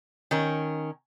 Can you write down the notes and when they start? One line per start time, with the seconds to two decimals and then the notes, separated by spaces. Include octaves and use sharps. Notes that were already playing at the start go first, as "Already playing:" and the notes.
0.31 D#3 C#4 A#4